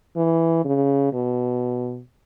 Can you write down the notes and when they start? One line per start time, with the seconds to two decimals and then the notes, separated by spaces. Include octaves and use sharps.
0.17 E3
0.65 C#3
1.13 B2